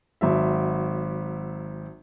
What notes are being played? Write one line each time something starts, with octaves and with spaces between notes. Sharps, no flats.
G#1 F#3 E5